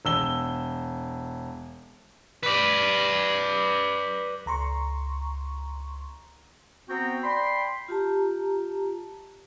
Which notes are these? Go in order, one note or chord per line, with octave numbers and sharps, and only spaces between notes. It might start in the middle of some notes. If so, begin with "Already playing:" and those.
E1 E6 G7
B4 D5
C#2 A#5 C6 C#6
B3 C4 F#4 C5 G5 A#5
D5 G5 B5 C6
F4 G4 A5 A#5